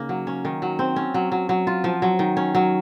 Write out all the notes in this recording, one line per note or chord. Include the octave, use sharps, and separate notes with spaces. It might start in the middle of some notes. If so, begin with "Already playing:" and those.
Already playing: C#3 A#3 D#4
F#3
C#4
D#3
F#3
C4
C#4
F#3
F#3
F#3
F4
F3
F#3
D#3
C#4
F#3